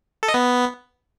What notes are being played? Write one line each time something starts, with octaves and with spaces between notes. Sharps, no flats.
A4
D#5
B3